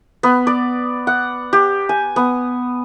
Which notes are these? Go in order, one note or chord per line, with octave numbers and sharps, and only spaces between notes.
B3
D5
F#5
G4
G#5
B3